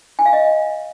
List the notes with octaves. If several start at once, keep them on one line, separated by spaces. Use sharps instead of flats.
G#5
F5
D#5